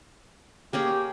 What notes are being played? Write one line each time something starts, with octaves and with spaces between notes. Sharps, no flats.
A#3 C#4 G4 G#4